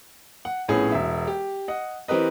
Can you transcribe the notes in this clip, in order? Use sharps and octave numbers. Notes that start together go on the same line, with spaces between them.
F#5
A#1 A2 B3 C#4 G#4
E1 E5
G4
D#5 F#5
E3 C4 G4 A#4 B4 D#5